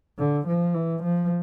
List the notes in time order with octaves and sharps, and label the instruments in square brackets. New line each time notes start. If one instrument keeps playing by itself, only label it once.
[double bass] D3
F3
E3
F3